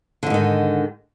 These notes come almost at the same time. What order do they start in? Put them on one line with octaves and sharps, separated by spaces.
D3 F2 G#2 D#3